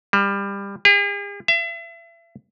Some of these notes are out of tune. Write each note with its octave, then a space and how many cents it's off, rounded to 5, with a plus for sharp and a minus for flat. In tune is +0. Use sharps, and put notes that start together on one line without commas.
G3 +25
G#4 -45
E5 +35